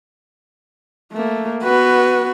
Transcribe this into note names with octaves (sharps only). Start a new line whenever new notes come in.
A3 A#3
B3 F#4 B4